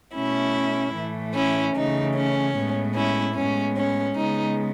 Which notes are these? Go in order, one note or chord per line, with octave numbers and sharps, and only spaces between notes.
B2 A3 C#4 E4
A2 E3 A3
C#4 E4
C#3 E3 A3 D#4
C#4
A2 G#3 B3
C#4 E4
A2 G#3 B3 C#4
C#4
C#3 G#3 B3 D#4